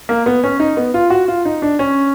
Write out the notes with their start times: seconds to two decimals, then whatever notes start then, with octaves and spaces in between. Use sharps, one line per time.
0.09 A#3
0.26 B3
0.44 C#4
0.60 D#4
0.77 B3
0.94 F4
1.10 F#4
1.28 F4
1.45 D#4
1.62 D4
1.79 C#4